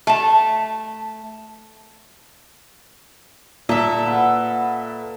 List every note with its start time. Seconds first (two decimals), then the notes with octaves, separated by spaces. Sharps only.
0.07 A3 A5
3.69 A#2 A4 E5
4.07 B4 F5 F#5